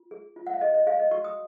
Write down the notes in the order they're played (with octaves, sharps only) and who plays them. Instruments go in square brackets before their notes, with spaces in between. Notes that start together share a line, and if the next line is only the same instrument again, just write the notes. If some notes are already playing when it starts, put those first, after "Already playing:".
Already playing: [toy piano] F4
G#4
F4
F#5
F5
G#4 D#5
D#5
G#4 F5
D#5
F#4 C#6
D#6